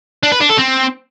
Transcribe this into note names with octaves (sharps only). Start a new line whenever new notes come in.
D4
B4
D4
A4
C4